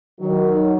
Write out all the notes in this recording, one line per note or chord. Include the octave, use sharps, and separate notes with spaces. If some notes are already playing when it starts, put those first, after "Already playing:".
D#3 F#3